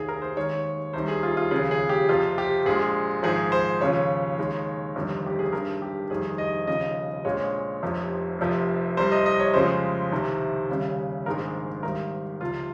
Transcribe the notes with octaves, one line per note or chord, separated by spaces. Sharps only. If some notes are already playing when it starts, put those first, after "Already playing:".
Already playing: F1 D#2 D#3 G#4
A#4
C5
D#2 D#3 G#3 C#5
C2 C3 D#3 G3 C5
G#4
F4
F4
D#2 C#3 F3 G#4
G#4
G4
F2 C3 F3 F4
G4
A#1 A#2 G#3 G#4
G#1 G#2 F3 G#4
C5
D#2 C#3 F3 C#5
D#2 D#3 G#3
G1 F2 C3 D#3 G3
G4
G#4
G#1 G2 G3 A#4
G4
F1 F2 D#3 G3 G#4
D#5
F1 D#2 C#3 F3 D#5
A#1 A#2 G#3 C#5
F1 F2 C3 F3
F1 F2 C3 F3
C2 C3 G3 C5
D#5
D#5
C#5
F2 C#3 F3 G#3 C5
C2 C3 D#3
D#2 C#3 G3
A#1 G#2 D#3 G#3 A#4
G#1 G#2 G3 A#4
C#2 C3 F3 F4